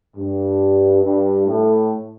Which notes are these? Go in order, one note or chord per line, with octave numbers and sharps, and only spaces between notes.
G2
G2
A2